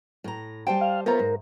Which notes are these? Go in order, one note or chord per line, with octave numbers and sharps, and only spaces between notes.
A2 A#5
G3 C5 G5 A5
F5
A3 B3 F4 A#4 C5 A#5
G#2